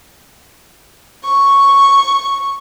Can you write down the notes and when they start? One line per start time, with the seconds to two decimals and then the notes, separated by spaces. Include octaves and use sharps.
1.25 C#6